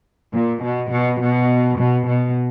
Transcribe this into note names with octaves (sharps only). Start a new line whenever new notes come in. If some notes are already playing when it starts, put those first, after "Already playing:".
A#2
B2
B2
B2
B2
B2